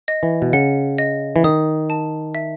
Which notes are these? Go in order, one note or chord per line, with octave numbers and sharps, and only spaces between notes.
D#5
E3
B2
C#3 F#5
D#5
E3
D#3 D#6
A5
E5